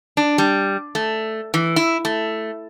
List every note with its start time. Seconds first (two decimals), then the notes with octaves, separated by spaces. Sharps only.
0.17 D4
0.38 G3
0.95 A3
1.54 E3
1.76 E4
2.05 A3